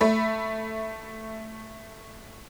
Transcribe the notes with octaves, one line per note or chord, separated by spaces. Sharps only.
A3 E5 B5